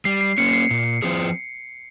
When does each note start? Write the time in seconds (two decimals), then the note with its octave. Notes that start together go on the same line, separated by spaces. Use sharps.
0.05 G3 C7
0.21 C7
0.38 A#3 C#4 C#7
0.53 C7
0.71 A#2
1.02 F3 C4 F4 G#4